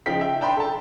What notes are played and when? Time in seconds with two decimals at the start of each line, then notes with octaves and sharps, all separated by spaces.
0.06 C#3 F3 D#4 G5 B6
0.21 E5 G5
0.41 D4 G5 B5 C6
0.57 A4 A5